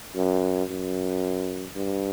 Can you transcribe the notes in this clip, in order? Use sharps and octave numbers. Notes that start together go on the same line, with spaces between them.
F#2
F#2
G2